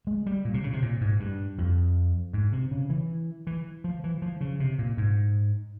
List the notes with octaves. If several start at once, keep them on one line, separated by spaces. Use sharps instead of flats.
G#3
G3
A#2
C3
C#3
C3
A#2
G#2
G2
F2
G#2
C3
C#3
E3
E3
F3
E3
F3
C#3
C3
A#2
G#2